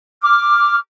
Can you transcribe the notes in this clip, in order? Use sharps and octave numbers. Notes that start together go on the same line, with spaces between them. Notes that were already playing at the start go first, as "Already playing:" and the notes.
D6 F6